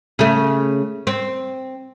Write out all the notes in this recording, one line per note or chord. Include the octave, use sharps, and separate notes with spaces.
C#3 A3
C4